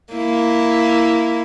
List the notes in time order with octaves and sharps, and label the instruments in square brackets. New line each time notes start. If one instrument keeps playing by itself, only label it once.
[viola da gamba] A#3 E4